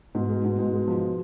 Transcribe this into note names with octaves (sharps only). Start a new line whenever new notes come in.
G#2 B2
G#3
G#2
G#2
G#3
F3